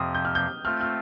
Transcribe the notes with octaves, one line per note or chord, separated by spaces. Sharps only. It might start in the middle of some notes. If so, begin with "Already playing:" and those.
Already playing: F2 C3 F3 C4 D#6 F6
G6
F6
G6
A3 C4 F4 F6
F6